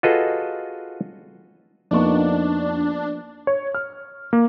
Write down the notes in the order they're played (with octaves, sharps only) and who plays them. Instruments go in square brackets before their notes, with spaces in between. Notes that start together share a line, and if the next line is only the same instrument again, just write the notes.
[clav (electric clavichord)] F4 F#4 G#4 A4 B4 D#5
[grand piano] F2 D#4 C#6 [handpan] F3 A#3 B3 [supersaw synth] D4
[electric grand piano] C#5
F6
A#3